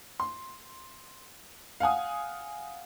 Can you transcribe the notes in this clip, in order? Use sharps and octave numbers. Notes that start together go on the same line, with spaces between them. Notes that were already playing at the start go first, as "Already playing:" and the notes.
C6
F5 F#5 G#5 D#6